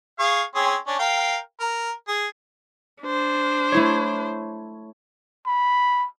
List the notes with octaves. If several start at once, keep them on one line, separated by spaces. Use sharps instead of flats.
G#4 F5 C#6
C4 C#4 G#4
C#4 D4
A#4 F5 G5
A#4
G#4
D4 C5
A3 E4 C#5
B5